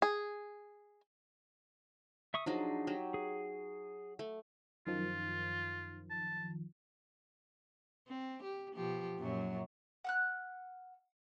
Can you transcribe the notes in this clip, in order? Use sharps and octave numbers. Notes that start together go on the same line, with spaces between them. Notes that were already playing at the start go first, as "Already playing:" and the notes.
G#4
E5 C#6 D#6
F3 F#3 D4 D#4 G#4
F#3 G4
G#4
A3
F#2 D#3 F3 F4
A5
C4
G4
B2 F3 G4
F#2 A#2 F#3
F#5 F6 F#6